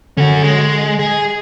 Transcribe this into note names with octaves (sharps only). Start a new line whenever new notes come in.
D3 C#4 F#4
G#3
G#4